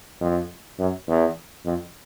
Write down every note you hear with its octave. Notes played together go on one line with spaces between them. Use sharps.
F2
F#2
E2
F2